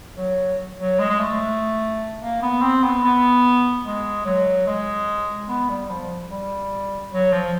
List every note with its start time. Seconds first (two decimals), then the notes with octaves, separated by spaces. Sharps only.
0.17 F#3
0.79 F#3
0.99 G#3
1.09 G#3
1.19 A3
2.22 A#3
2.42 B3
2.62 C4
2.84 B3
3.03 B3
3.86 G#3
4.25 F#3
4.67 G#3
5.49 B3
5.69 G3
5.90 F3
6.31 G3
7.13 F#3
7.33 F3